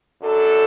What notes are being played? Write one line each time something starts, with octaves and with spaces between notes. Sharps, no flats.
F#2 F#3 D4 A4